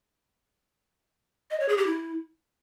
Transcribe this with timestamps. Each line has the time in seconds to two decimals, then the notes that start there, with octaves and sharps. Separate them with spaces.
1.51 D#5
1.60 C#5
1.69 G#4
1.78 G4
1.87 E4